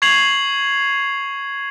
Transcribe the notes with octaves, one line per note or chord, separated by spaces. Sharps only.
C#6 G#6 C7 F7 F#7